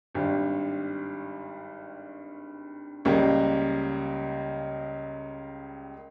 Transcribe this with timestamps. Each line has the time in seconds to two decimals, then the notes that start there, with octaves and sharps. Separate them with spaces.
0.15 G#1 G2 G3
3.05 C#2 C#3 G3 A#3